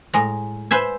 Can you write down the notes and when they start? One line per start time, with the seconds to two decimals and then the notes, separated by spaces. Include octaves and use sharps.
0.14 A2 G#3 A#5
0.71 B4 C5 E5 G#5